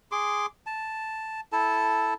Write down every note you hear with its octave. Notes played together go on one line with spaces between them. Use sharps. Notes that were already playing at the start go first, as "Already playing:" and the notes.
G#4 C6 D6
A5
E4 A4 A5